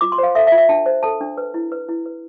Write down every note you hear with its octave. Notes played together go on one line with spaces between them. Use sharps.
F4 D6
C6
C5 F5
A4 E5
E5
F4
E5
D4 A5
C5
A4 A5
D4
B4
E4
B4
E4
B4